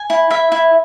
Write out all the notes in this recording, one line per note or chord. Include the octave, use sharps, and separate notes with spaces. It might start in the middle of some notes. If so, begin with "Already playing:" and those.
Already playing: G#5
E4
E4 E5
E4